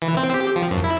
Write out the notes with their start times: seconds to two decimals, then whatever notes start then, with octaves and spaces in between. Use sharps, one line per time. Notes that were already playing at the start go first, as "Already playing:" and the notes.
0.02 E3
0.17 C4
0.34 G4
0.56 F3
0.71 F#2
0.84 E4